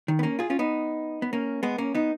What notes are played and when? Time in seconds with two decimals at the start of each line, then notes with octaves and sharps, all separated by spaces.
0.08 D#3
0.19 B3
0.23 A#3 C#4
0.39 F4 G#4
0.50 C#4 F4
0.59 B3 D#4
1.22 B3
1.33 A#3 C#4
1.63 G#3 B3
1.78 A#3 C#4
1.95 B3 D#4